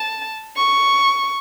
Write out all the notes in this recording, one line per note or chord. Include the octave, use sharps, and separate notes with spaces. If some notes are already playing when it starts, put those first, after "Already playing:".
Already playing: A5
C#6